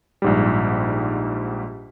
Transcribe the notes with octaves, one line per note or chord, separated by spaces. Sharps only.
A#1 G#2 G3